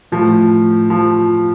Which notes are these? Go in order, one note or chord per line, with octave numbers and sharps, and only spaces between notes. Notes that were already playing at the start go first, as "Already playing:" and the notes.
A2 F3
F3